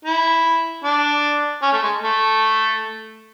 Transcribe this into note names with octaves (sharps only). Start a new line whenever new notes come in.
E4
D4
C#4
A3
G#3
A3